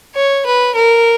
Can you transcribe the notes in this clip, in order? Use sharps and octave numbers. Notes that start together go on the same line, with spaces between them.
C#5
B4
A#4